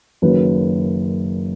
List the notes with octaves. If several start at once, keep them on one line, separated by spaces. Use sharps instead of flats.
F#1 F#2 D#3 B4